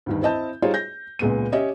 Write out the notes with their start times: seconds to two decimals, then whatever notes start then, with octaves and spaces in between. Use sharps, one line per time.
0.06 D2 G2 D#3
0.22 C4 E4 D#5 A5 G6
0.62 G3 D#4 F4 G#4 C5 C#5
0.74 G6 A#6
1.19 C#2 A#2 G#3 B3 D#7
1.52 C#4 G4 C#5 D#5 E5